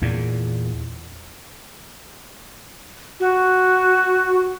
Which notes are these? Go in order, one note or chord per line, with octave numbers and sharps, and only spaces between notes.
E2 A#2
F#4